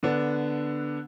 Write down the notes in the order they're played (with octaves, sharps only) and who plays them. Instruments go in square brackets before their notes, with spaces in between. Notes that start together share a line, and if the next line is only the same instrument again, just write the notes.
[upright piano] D3 B3 D4